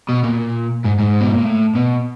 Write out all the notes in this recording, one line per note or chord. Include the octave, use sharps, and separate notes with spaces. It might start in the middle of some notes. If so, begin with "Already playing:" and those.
B2
A#2
G#2
G#2
B2
A#2
A2
B2